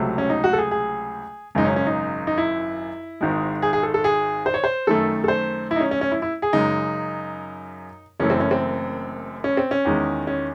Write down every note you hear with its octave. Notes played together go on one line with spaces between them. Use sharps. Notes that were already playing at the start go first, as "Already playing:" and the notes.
Already playing: C#2 C3 F#3 A3
C#4
D#4
F#4
A4
G#4
G#4
G#1 F#2 C#3 G#3 D#4
C#4
C#4
D#4
D#4
E4
G#1 G#2 D#3 G#3
G#4
G#4
A4
A4
G#4
C5
C#5
C5
F#2 D#3 A3 A4
A4
C5
E4
D#4
C#4
C#4
C#4
E4
E4
G#4
F#2 C#3 G#3 D#4
F#1 F#2 E3 A3 C#4
C4
C#4
C4
C#4
C4
C#4
E2 D#3 G#3
C#4